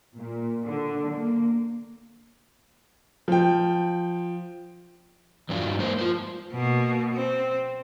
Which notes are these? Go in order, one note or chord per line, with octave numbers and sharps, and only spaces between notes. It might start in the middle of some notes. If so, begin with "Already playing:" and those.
A#2
D3
A#3
F3 G5
E2 G2 F#3 D4 E4 F4
G2 D#4
G#3 A#3 C5
F4 C5
B2 A#3
C4